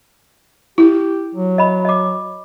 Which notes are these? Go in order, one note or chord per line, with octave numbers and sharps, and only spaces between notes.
E4 G4
F#3
D#5 B5
D#5 D6